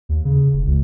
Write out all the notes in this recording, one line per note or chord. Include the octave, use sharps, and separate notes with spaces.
D#2
C#3
F1
C#2